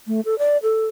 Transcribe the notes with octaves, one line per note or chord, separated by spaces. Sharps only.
A3
A4
D5
A4